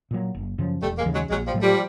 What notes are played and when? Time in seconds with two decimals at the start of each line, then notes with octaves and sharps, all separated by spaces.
0.11 A#2 F#3
0.35 F#1
0.58 F#2 C#3 F3
0.82 E1 G3 A3
0.98 G#3 A#3
1.06 D#2 C#3 E3
1.14 F#3 G#3
1.30 A#1 F#3 G#3
1.47 F3 G3
1.54 A2 F#3 A3
1.63 F3 G3